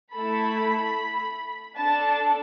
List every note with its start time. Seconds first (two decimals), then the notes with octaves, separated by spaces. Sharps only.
0.13 A3 E4 A4 B5
1.77 D4 A4 A5